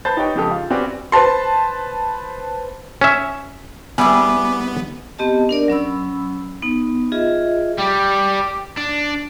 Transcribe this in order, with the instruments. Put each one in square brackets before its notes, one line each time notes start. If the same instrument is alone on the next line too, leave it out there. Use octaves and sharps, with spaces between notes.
[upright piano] B4 C5 A5 B5 G6 A6
D#4 G4 B4 C#5 G5 A6
F2 G#2 C#3 G4 A4 D#6
F4
C4 C#4 F#4 G4 B4 D5
[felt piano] B4 C5 A5 C6
[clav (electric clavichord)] C#4 E5
[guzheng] G3 E4 G#4 [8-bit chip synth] B3 [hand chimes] G#5 D6
[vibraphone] B3 C4 G4 D#5 A5
D4 A#4 D5
F#3 C#4 B5 E6
B3 D#4
F4 G#4 D#5 E5
[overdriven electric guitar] G3 [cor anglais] G4
[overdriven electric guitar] D4